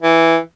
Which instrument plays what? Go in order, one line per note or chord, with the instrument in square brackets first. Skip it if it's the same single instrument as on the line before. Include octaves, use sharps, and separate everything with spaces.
[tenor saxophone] E3